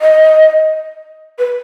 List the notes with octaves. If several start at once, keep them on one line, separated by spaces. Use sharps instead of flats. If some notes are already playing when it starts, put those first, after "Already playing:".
D#5
B4